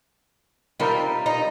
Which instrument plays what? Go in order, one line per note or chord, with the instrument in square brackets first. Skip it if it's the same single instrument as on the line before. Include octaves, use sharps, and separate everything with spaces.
[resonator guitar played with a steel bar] C3 G3 C4 F4 A#4 [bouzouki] D#4
[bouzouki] D#4